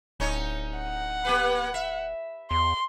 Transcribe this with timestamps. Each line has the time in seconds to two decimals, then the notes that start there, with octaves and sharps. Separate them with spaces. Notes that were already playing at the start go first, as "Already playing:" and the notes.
0.20 D1 C#4 D#4 C#5
0.78 F#5
1.25 A#3 G4 B4
1.74 E5
2.51 E2 C6